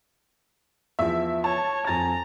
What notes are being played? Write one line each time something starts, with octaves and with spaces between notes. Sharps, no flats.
E2 F3 E5
C#5 A5
F2 G#5 A#5 A6